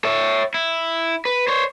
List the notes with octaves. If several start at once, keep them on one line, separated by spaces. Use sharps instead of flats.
C#5 E5
E4
B4
C5 C#5